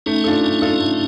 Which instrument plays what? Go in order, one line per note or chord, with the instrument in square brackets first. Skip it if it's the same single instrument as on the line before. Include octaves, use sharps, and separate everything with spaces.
[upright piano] A3 [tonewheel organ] C#4 D#4
[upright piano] D4 F4 A4
A3
D4 F4 A4
A3